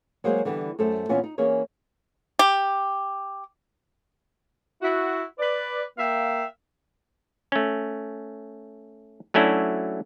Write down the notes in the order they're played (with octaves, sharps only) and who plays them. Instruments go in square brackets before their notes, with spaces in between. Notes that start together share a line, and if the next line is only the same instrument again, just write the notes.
[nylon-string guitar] F#3 G#3 A#3 F#4 G#4 C5
D3 E3 G3 B3
F#2 A3 A4 C5
A#2 E3 B3 C#4 E4 F4
D#4
E3 A#3 C#4 G#4 C#5
[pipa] G4
[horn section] E4 F#4
B4 D5
A#3 E5 F5 G5
[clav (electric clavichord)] A3 C#4
F#3 A3 C#4 D4 E4 F#4